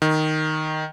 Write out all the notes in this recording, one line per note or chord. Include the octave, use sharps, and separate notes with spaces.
D#3